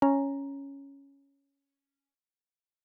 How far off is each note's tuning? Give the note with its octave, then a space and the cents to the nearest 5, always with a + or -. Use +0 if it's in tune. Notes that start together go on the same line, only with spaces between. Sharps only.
C#4 +0 A#5 +0